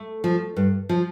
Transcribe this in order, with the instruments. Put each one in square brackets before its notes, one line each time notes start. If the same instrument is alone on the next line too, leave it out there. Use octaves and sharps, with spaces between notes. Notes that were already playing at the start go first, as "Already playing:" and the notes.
Already playing: [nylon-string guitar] A3
F3
G2
F3